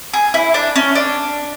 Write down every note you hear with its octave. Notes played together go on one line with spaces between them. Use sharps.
G#4
E4
D4
C#4
D4